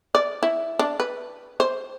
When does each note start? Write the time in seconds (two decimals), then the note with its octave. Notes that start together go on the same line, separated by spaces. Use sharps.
0.15 D5
0.43 E4
0.79 D4
1.00 B4
1.60 C5